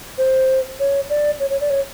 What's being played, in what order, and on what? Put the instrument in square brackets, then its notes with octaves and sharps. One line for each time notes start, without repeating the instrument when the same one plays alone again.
[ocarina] C5
C#5
D5
C#5
C#5
D5
C#5